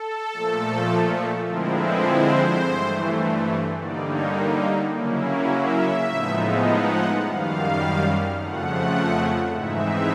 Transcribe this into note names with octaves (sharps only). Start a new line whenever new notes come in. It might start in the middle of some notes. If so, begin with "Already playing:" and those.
Already playing: A4
A#2 F3 A3
D3 F3 G#3 C4 E4 A#4
B4
C5
G2 E3 A3
D3 G3 A#3 D#4 D5
C#5
C#3 F#3 A#3 C#4 E4
E5
A2 F3 G#3 B3 D#4
F#5
F#2 D#3 G3 F5
F2 C#3 F3 A3 F#5
G#2 E3 G#3 C4 D#4 E5